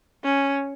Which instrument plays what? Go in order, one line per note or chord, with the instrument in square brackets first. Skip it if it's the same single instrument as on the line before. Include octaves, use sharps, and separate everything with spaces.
[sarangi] C#4